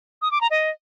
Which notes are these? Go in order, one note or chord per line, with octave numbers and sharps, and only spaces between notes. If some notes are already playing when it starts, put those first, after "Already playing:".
D#6
D6
A#5
D#5